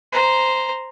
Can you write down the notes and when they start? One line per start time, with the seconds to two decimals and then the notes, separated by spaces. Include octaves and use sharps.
0.12 C5 A#5